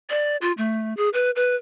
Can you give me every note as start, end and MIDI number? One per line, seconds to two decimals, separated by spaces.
0.10 0.36 74
0.41 0.52 65
0.57 0.94 57
0.97 1.09 68
1.13 1.31 71
1.36 1.56 71